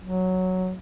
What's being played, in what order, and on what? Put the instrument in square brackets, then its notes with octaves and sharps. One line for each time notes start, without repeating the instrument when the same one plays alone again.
[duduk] F#3